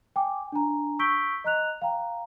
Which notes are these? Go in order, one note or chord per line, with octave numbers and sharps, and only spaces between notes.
G5 G#5 D6
D4 G#5 A#5
C#6 E6 G6 B6 D7 G7
D#5 A#5 F#6 F7
F5 G5 A#5